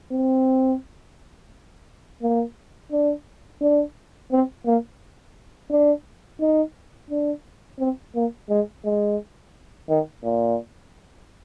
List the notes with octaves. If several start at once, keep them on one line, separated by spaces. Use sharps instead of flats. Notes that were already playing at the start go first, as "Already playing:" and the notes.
C4
A#3
D4
D4
C4
A#3
D4
D#4
D4
C4
A#3
G#3
G#3
D#3
A#2